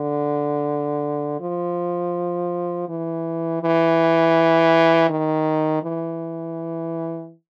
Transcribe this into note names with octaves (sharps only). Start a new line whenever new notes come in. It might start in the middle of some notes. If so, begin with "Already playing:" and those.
Already playing: D3
F3
E3
E3
D#3
E3